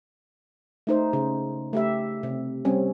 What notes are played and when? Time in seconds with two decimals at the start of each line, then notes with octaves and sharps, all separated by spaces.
0.87 A3 D#4 C5
1.13 C#3
1.73 A3 G4 E5
2.23 C3
2.65 G3 C4 C#4